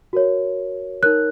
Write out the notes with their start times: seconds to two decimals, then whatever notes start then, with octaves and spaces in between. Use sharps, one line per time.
0.13 F#4 A#4 C#5
1.03 D#4 A#4 C#5 F#6